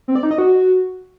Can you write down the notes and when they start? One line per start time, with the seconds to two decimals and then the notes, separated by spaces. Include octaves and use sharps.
0.08 C4
0.16 D5
0.23 D#4
0.31 D#5
0.38 F#4